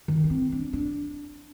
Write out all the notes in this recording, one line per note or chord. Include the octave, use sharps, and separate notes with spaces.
D#3
D4
C4
D4
D4